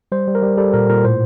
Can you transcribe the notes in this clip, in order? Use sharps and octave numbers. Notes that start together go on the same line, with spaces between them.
G3 C5
G3
A#4
G3
G3 A4
A#2 A#4
A#2 A#4
A2 C5